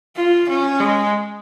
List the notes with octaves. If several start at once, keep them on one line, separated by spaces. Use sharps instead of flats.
F4
C#4
G#3